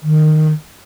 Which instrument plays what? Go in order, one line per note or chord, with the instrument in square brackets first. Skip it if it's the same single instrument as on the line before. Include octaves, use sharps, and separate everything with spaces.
[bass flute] D#3